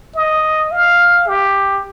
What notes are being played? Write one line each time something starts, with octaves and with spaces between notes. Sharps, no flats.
D#5
F5
G4